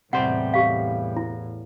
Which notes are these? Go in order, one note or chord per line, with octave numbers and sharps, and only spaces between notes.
E2 A2 C3 G3 C5 F#5
G4 F5
E4